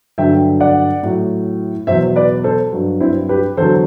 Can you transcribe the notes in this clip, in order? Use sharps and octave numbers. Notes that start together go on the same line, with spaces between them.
G2 D3 F#3 E5 G5
D5 F#5
A2 F#3
E2 B2 F#3 C5 E5
B4 D5
A4 C5
G2 F#3
C4 E4
G4 B4
E2 D3 F#3 A4 C5